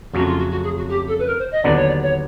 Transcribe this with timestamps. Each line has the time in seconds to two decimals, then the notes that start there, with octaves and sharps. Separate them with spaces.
0.14 F2 C#3 F#3 A3 C#4 F#4
0.25 F4
0.38 F#4
0.51 F#4
0.64 G#4
0.76 F#4
0.89 G4
1.07 A4
1.19 B4
1.27 A#4
1.39 C5
1.51 D#5
1.63 D#2 D3 F#3 B3 D4 D5
1.75 C#5
1.87 D5
2.02 C#5